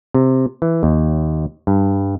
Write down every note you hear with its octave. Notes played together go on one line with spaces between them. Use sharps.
C3
E3
D#2
G2